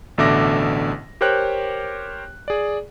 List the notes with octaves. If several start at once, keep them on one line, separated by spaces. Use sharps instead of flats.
A1 B2 D3 E5 D6 A#6
G4 A#4 C5 C#5 G5 F#6
G#4 D5